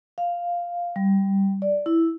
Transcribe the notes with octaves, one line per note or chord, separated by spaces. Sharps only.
F5
G3
D5
E4